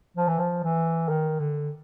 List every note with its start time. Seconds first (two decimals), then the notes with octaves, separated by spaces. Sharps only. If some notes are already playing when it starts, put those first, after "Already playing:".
0.17 F3
0.28 E3
0.38 F3
0.64 E3
1.09 D#3
1.39 D3